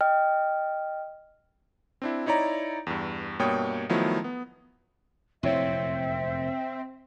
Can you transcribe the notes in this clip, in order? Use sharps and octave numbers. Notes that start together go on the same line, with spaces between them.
D#5 G5 F6
C4 D4 E4
D#4 E4 C#5 D5 A#5
E2 G2
G2 B2 A#3 C#5 G5 D#6
D#3 F3 F#3 A3 B3 E4
B3
F1 F#2 A#2 C4 E4 C#5 E5 F5